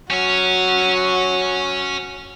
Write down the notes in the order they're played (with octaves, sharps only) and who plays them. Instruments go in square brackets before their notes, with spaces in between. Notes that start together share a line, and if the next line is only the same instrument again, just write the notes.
[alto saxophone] F#3 [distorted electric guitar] C#4 C#5 [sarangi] F#4